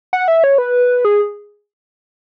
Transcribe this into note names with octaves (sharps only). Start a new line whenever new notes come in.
F#5
E5
C#5
B4
G#4